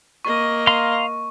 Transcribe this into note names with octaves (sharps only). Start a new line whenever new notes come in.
A#3 D#5 C#6
F5 A#5 C6